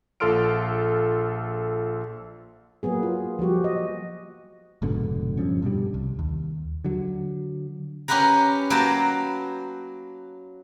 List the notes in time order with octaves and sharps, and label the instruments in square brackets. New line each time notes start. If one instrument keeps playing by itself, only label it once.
[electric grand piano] A#1 F4 A4 C6 F6 D7
[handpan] F#3 A#3 B3 G#4
F4
F3 G3 F#4 G4
D#5
[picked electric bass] F1 G#2 B2 D3
E1 G2 F3 C#4
G2 B2 D3 G3
C2
D#2
D3 F#3
[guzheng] C#4 G4 A#4 B4 F#5 A#5
F#3 A#3 B4 G5 A5